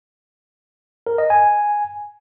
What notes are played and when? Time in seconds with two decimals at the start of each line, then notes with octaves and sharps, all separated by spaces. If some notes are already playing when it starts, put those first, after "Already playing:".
1.07 A#4
1.18 D#5
1.30 G#5